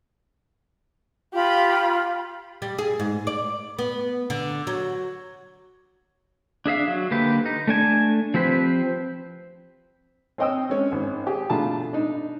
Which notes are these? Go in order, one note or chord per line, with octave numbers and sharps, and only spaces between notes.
F4 G4 B5
G3
G#4
G#2
D5
B3
D3
F#3
D4 G#4 E5 F5
F#3
D3 A#3 G4 B4
D#4
A3 D4 G#5 A5
F3 C4 G4 B4 C5
C4 C#5 D#5 G5 D#6 E6
G#3 C#4
G#1
G4 G#4
B2 A3 D4 F4 A5 A#5
D4 D#4